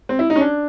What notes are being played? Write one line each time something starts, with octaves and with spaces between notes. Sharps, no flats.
C4
E4
D#4
C#4
D4